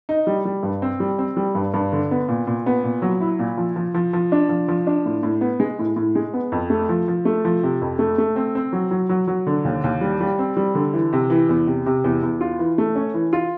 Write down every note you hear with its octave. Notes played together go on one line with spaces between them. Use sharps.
D#4
G3
G3
G2
C4
G3
C4
G3
G2
G2
D3
B3
A#2
A#2
B3
A#2
F#3
E4
A#2
F3
F3
F3
F3
D4
F3
F3
D4
A2
A2
B3
G#3
A2
A2
G#3
B3
F2
A3
F3
F3
A3
F3
C3
F2
A3
A3
C4
C4
F#3
F#3
F#3
F#3
D3
D#2
D#2
G3
G3
C4
G3
D3
E3
C3
E3
E2
C3
C3
E2
E2
F4
E3
A3
C#4
E3
F4